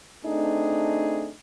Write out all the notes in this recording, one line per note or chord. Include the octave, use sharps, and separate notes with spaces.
A3 C4 D4 D#4 G#4